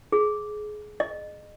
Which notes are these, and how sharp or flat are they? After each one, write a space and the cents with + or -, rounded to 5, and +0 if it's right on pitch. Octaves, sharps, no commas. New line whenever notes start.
G#4 +25
D#5 -30